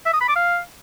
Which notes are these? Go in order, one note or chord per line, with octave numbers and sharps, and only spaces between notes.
E5
D#6
B5
D6
F5